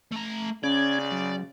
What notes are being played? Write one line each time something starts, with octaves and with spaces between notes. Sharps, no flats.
A3 A#5
C#3 C#4 D5 G#6
F#3